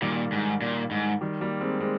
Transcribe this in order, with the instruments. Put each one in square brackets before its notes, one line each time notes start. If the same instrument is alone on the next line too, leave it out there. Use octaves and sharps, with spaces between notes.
[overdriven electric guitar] A#2 [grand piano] D#3 G3
[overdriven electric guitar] G#2
A#2
G#2
[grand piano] D#3 G3
G3 A#3
G#3 C4
G#3 C4